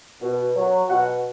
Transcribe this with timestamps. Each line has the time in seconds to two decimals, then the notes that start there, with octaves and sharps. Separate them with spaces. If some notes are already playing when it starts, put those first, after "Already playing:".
0.21 B2
0.56 F#3
0.89 B2 F#4 F#5